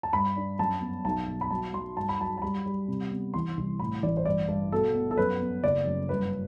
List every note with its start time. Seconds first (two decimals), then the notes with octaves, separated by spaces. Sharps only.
0.03 A5
0.13 G2 B5
0.36 D4
0.59 F#2 A5
0.81 B3
1.05 B1 A5
1.28 B2
1.41 B5
1.51 F#3 A5
1.73 F#3 C6
1.97 G2 A5
2.09 B5
2.20 F#3 A5
2.38 A5
2.42 G3 B5
2.66 G3
2.88 C3
3.11 B3
3.34 E3 C6
3.57 C2
3.79 A2 B5
4.03 A1 D5
4.17 C5
4.25 G2 D5
4.48 G2
4.72 B2 A4
4.95 B3
5.11 A4
5.18 F#2 B4
5.41 B3
5.64 F#1 D5
5.86 F#2
6.09 G2 B4